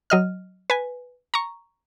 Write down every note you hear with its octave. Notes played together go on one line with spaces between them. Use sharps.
F#3 D#5 F6
B4 G#5
A#5 C#6